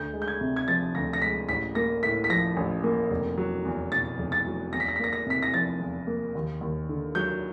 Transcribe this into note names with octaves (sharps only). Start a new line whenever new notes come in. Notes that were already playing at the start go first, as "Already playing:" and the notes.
Already playing: D2 G6
G#3
G6
G#6
C3
G#6
F3 A6
D2 A#6
A#6
G#3 B6
A1 B6
A#3 A#6
A2 B6
B6
F3 A#6
A1
A#3
F1
F#3
E2
B2 A6
F1
A6
F#3
E2 A#6
B6
A#6
B6
A#3 A#6
A#6
C3 B6
A#6
F3 A6
E2
A#3
D#2
D#2
D3
F#3 G6